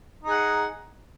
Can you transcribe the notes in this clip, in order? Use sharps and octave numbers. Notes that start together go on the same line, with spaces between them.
D#4 G#4 F#5